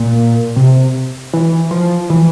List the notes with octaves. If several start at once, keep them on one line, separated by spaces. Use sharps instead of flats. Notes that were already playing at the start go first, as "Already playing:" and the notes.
Already playing: A#2
C3
E3
F3
E3